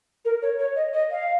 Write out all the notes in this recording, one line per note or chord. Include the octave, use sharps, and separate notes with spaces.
A#4
C#5
C#5
D#5
D#5
F5